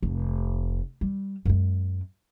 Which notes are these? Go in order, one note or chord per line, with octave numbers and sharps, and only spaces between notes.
F1
G3
F#2 G#3